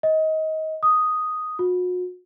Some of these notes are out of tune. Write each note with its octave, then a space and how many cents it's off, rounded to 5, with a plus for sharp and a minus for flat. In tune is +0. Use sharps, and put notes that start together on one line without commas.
D#5 +25
D#6 +0
F#4 -40